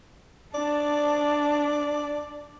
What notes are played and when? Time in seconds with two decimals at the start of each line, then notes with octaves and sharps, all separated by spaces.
0.55 D4 D5